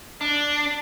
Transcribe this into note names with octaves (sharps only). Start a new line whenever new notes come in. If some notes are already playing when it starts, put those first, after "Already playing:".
D4